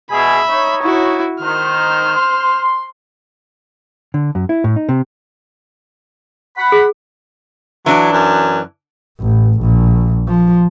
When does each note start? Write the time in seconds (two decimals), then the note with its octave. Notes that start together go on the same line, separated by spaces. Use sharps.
0.11 B2 G#4 E5 B5
0.48 D#4 C#5
0.83 E4 F#4
1.41 D#3 C5 F6
2.16 C6
4.14 D3
4.35 F#2
4.49 E4
4.64 A2
4.76 D#4
4.89 C3
6.57 F#5 B5
6.72 G#4
7.86 E3 F#3 D4
8.12 F#2
9.20 A1
9.61 A#1
10.28 F3